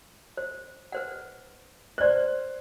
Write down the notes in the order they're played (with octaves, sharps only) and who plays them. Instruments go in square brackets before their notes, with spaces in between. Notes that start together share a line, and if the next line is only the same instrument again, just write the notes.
[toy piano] C5
B4 C5 F#5
[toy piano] B4 D5 [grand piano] C5 F#6